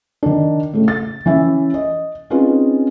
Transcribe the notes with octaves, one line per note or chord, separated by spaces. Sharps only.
D#3 D4
A2 C#3 A3
A6
E3 C#4 E5
D#5
C4 C#4 D#4 F4 G#4 B4